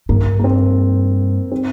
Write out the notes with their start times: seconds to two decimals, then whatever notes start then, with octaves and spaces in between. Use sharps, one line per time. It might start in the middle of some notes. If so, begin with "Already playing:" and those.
0.09 G2 A#3
0.39 A#3
0.44 C4
1.52 C4